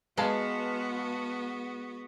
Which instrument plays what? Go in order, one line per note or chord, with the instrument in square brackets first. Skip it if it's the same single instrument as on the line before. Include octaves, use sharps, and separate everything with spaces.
[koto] G#3 [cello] B3 F#4 [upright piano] B4 F5 A5